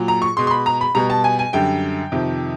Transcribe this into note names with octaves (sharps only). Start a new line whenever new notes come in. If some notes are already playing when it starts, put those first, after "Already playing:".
Already playing: A#2 F#3
A#5
C#6
B2 G#3 C6
C6
B5
A#5
B5
B2 G3 A#5
A5
G#5
G#5
F#2 D3 G3 G5
F2 C3 D#3